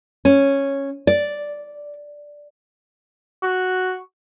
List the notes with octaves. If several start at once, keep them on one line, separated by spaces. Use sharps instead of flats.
C#4
D5
F#4